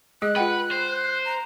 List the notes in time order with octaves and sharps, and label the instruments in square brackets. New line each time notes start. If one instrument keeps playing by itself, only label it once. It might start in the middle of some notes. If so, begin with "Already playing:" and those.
[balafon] G#3 G#4 D#5 [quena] F#6
[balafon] F4 F#5 G5 [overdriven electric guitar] B4
[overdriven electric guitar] C5
[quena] A#5